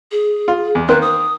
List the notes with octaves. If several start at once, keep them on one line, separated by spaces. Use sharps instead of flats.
G#4
F4
E2
D#3 A#3 C5 F#6
D#6